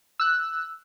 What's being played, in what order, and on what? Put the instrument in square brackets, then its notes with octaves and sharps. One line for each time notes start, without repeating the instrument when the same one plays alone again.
[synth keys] E6 F#6